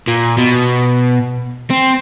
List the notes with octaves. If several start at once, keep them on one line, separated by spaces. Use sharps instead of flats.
A#2
B2
C4